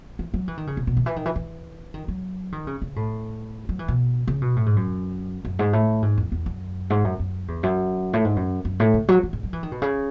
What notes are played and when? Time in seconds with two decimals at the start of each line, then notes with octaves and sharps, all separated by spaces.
0.19 E3
0.34 F#3
0.48 E3
0.58 D#3
0.67 C#3
0.77 B2
0.87 B2
0.97 D#3
1.06 E3
1.16 D#3
1.26 E3
1.36 E3
1.94 D#3
2.08 F#3
2.52 D#3
2.67 C#3
2.82 C#3
2.96 A2
3.69 F#3
3.79 E3
3.88 B2
4.27 C#3
4.42 B2
4.56 A2
4.66 G#2
4.76 F#2
5.45 F#2
5.59 G#2
5.73 A2
6.02 G#2
6.18 E2
6.32 E2
6.46 F#2
6.90 G#2
7.04 F#2
7.19 F#2
7.48 E2
7.63 F#2
8.13 A2
8.25 G#2
8.36 F#2
8.65 F#2
8.80 A2
8.94 C#3
9.09 F#3
9.23 E3
9.33 G#2
9.43 F#3
9.53 E3
9.63 D#3
9.72 B2
9.82 C#3